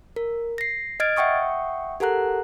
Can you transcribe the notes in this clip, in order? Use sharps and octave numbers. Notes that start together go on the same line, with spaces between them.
A#4
A#6 C7
D#5 F6 G#6 A6 D7
E5 F#5 G5 C#6 D#6
G4 A4 A#4 F#5 A#5 F#6